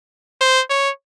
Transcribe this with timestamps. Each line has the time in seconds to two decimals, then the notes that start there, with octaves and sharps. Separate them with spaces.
0.41 C5
0.70 C#5